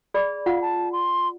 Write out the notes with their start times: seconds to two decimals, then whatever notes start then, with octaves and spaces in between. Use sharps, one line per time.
0.14 G#4 D5 B5
0.46 F4 F5 F#5
0.62 A5
0.93 C6